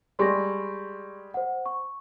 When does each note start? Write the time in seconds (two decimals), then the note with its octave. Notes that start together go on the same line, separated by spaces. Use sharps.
0.19 G3 G#3 C6 C#6 A#6
1.34 C5 F#5
1.66 C#6